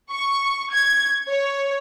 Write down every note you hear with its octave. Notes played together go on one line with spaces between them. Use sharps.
C#6
G#6
C#5